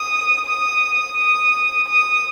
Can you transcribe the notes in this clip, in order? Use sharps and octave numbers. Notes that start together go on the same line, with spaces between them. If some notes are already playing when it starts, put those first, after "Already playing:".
Already playing: D#6
D#6
D#6
D#6